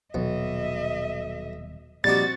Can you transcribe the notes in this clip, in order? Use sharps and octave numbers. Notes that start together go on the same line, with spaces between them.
D#1 B1 B2 F#3 D#5 E5
A#2 F3 G3 C4 D#4 F#4 G4 A6